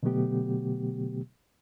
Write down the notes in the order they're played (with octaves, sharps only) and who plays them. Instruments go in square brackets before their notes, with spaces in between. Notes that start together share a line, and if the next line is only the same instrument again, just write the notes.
[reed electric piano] B2 D3 F#3 A3 B3 G4